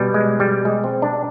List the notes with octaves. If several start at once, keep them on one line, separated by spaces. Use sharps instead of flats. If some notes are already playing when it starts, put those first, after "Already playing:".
Already playing: B2 G3
G#3
G3
G#3
C4
D4